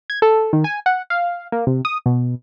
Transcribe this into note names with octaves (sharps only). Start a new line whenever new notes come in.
G#6
A4
D#3
G#5
F#5
F5
A#3
C3
D#6
B2